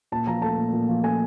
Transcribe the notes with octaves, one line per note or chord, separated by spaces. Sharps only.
A#2 A5
F3 A#5
A3 A5
A#2
A#2
F3
A3 G#5